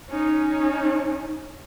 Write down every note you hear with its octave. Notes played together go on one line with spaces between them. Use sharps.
C#4 D#4